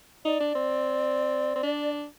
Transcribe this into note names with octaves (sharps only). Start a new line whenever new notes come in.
D#4 D5
D4
C4
C4
D4